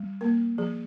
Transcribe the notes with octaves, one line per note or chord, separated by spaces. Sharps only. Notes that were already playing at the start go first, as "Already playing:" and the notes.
Already playing: G3
A#3 A#4
F3 G#4